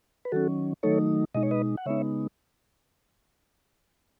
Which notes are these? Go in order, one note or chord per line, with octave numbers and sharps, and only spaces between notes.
B4
D#3 F#3 C#4 F#4 A4
D#3 F#3 A3 D#4 A4 C#5
B2 G#3 D#4 D#5
C#5
B4 D#5
F#5
C#3 G#3 B3 D#4 C#5 E5